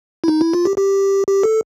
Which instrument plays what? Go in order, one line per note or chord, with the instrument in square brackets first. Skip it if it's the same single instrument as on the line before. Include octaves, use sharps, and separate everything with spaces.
[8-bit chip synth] E4
D#4
E4
F4
G4
G4
G4
A4